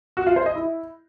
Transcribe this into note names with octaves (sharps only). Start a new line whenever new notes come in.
F#4
F4
C5
D#5
E4